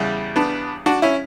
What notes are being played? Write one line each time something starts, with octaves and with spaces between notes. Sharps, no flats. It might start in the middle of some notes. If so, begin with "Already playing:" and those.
Already playing: E2 C#3 G3
B3 D4
D4 F#4
C#4 E4